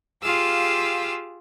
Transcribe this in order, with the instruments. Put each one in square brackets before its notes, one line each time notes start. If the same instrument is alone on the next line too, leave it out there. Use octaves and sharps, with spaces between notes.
[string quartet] F4 G4 G#4 F5 D6 E6